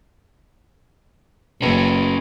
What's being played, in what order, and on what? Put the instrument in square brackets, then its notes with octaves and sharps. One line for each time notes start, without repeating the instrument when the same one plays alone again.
[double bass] F#1 [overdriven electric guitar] C#4 B4